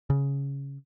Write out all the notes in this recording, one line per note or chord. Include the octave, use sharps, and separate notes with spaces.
C#3